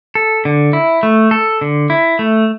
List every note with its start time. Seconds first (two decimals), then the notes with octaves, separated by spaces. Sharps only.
0.15 A4
0.45 D3
0.73 E4
1.03 A3
1.31 A4
1.61 D3
1.90 E4
2.19 A3